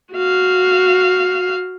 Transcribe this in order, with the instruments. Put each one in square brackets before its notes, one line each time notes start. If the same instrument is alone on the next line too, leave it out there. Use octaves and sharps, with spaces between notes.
[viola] F#4 F5